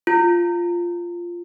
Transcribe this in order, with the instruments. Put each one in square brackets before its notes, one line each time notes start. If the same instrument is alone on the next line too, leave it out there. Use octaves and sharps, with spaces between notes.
[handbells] F4